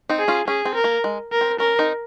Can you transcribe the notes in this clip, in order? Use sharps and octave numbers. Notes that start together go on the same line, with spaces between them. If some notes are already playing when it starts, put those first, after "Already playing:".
C4 D#4
G#4
C#4 F4
C#4 G#4
C4
A#4
A#3
G#3
A#4
C4
C#4 A#4
C4 D#4